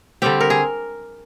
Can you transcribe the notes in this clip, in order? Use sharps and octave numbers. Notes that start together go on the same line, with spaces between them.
D3 G3 C4 G4
A#4
G#4